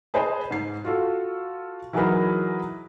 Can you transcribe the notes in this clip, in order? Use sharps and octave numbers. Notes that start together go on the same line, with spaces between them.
G#4 B4 C5 D#5 G#5 A5
G#2 C7
F4 F#4 A4
E3 F#3 D#4 G#4 A#4 B4